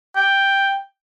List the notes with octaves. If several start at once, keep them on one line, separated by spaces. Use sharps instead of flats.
G5